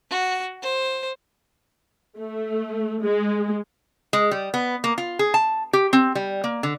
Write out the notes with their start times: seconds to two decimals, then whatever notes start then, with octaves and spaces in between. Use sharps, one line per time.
0.10 F#4
0.62 C5
2.18 A3
3.03 G#3
4.13 G#3
4.31 G3
4.54 B3
4.84 A#3
4.98 F4
5.19 G#4
5.34 A5
5.73 G4
5.93 C4
6.15 G3
6.44 A#3
6.63 D3